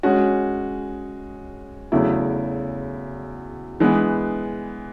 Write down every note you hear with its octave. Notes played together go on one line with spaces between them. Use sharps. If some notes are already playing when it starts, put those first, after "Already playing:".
G#3 C#4 F#4
E2 C#3 F#3 A3 E4
E3 G#3 B3